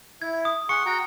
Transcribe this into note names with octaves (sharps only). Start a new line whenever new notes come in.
E4 G#6
D#6
G#4 F#5 C6 C#6 C#7
F#4 G5 A#5